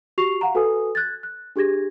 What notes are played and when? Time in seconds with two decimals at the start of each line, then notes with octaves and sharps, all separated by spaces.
0.18 F#4 G4 C#6 C7 F7
0.41 F5 F#5 A#5
0.55 F#4 A4 B4 G#5 D#6
0.95 F#6 G#6 A6
1.23 F#6
1.56 D4 G4 G#4 G#6 A#6